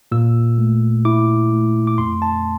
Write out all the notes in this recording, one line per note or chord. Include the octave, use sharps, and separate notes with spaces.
A#2 E6
A3
E4 D6
A3
D6
F2 C6
A5